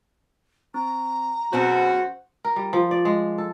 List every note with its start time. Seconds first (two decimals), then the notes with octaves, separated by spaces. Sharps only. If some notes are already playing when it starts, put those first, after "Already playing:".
0.74 C4 A#5
1.53 F#2 B2 B3 C4 F#4 G#4 C5 F#5
2.45 A#4
2.56 G3
2.73 F3
2.91 D5
3.05 G#3
3.38 A4